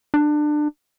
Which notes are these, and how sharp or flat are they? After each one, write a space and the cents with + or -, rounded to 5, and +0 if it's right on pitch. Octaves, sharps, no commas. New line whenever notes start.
D4 +25